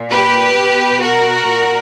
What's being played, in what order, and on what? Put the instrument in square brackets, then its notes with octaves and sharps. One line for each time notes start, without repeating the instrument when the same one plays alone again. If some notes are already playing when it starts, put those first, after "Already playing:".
Already playing: [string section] A#2
G4 B4
B2
F#4 A#4
A#2